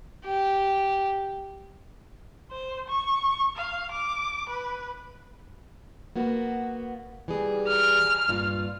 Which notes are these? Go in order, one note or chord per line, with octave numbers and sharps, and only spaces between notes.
G4
C5
C#6
F5
D6
B4
A#3 B3 F#4
E3 G3 G#4
F6
G2 A#2 F4